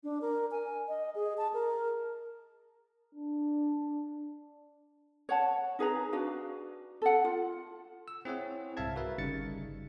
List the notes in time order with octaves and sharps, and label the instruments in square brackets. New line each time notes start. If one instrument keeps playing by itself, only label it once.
[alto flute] D4
A#4
G#5
D#5
G#4
A5
A#4
[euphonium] D4
[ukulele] C#5 F#5 A5
D#4 G#4 B4 A#5
D4 F#4 B4 F5
A4 F#5
F4
[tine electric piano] E6
C4 E4 G#4 C#5 F#5
C2 G#2 E5 F5 A5 G#6
F#4 A#4 B4 E5
G1 C#3 G3 D#4 A6 C#7